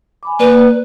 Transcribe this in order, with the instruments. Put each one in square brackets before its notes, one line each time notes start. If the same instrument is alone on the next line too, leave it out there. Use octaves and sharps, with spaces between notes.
[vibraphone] G#5 B5 D6
[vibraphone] A#3 D5 [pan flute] B4